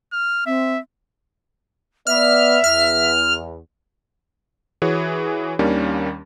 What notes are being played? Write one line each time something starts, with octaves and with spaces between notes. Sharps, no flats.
F6
C4 E5
B3 D5 E5 F6
E2 F6
E3 F#4 G#4 C#5
D#2 D#3 G3 A#3 C#4 D4